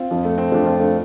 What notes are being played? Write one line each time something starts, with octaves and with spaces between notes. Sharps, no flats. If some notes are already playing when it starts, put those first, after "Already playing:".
Already playing: C4 F4
F2 F3
A3
C4
F2 F3 A3 D4
C4 F4
A3 D4